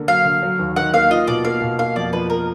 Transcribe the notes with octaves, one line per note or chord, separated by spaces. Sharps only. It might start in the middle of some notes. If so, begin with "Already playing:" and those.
Already playing: D3 A#3
F#3 F5
D3
F#3
D#2
D#3 F#5
A#3 F5
F4 D#5
B2 D5
A#3 F5
B2
A#3 F5
F2 D5
F3 B4
A#4